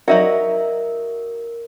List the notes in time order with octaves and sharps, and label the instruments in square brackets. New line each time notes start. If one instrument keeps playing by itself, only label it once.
[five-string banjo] F#3 D#4 F#4 [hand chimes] A#4 [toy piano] D5 E5